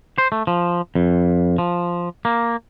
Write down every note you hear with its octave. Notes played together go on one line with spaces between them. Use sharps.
C5
A3
F3
F2
F3
A#3